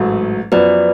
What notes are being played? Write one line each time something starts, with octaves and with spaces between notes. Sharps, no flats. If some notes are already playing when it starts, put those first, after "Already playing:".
Already playing: A1 G#2 F#3 A3
F#2 F3 B3 B4 D5